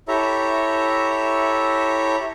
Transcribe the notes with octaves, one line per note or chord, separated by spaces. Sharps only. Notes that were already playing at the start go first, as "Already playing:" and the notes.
E4 G4 A4 C#5 E5 A#5